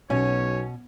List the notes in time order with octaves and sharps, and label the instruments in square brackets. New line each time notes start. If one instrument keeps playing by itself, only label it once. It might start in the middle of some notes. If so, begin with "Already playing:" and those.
[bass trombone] B1 [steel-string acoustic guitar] B2 [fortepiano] C#4 [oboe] C#5